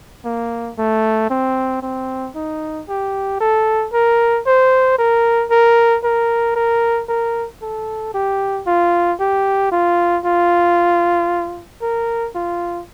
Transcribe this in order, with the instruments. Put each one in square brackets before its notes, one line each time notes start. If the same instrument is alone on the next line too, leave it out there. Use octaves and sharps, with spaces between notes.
[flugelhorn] A#3
A3
C4
C4
D#4
G4
A4
A#4
C5
A#4
A#4
A#4
A#4
A#4
A4
G4
F4
G4
F4
F4
A#4
F4